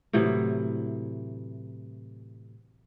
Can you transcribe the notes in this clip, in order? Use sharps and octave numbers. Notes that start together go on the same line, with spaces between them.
A2 C3 E3 F#3